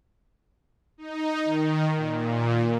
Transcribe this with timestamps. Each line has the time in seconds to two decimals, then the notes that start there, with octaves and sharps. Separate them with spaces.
0.98 D#4
1.45 D#3
1.96 A#2